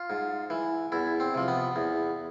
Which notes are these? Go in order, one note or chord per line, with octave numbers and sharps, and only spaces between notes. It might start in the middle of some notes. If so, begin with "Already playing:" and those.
Already playing: F4
G#2
E3
E2 E4
C4
C3 F3
B3
E2